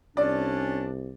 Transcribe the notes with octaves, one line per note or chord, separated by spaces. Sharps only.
C2 C#4 D4 D5